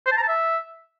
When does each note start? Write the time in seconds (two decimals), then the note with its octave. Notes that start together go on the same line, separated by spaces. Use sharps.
0.06 C5
0.12 A5
0.17 A#5
0.23 A5
0.28 E5